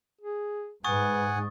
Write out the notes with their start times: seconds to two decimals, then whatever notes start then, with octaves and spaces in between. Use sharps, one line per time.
0.21 G#4
0.84 G#2 B4 F#5 G#5 C#6 D#6 A6